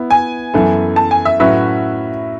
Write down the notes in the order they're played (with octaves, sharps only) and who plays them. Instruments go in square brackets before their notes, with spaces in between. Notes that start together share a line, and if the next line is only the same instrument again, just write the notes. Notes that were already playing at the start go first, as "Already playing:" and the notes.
Already playing: [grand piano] B3 E4
[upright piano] G#5
[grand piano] F#2 E3 B3 E4 A4
[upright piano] A5
G#5
E5
[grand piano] A2 F#3 C#4 F#4 B4 [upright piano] E5